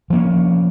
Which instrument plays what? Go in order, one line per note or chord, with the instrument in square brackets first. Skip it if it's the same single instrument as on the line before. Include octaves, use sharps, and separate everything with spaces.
[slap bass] F3 A#3 C#4